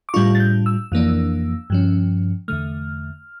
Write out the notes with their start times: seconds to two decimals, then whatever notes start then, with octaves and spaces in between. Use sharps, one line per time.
0.09 D6
0.13 A2 G3 D4 F4 C#6
0.35 A6
0.40 G6
0.66 E6
0.92 F2 E3 A#3 D4
1.70 G2 F3 C#4
2.48 E2 D3 A3 F6